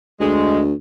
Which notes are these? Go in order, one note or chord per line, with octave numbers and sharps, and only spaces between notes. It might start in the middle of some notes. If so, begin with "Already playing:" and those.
D2 G#3